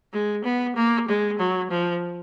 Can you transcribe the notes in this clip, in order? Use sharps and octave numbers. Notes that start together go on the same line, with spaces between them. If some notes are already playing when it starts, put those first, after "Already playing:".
G#3
B3
A#3
G#3
F#3
F3